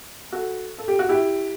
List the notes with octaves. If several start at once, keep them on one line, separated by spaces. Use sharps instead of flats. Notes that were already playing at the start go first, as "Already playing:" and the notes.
F#4 A4
A4
G4
F#4
E4 G4